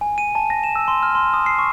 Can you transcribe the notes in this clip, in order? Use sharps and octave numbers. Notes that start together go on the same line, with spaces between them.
G#5
D#7
A5
A#6
E7
E6
C6
F6
C6
D#6
C7
C#6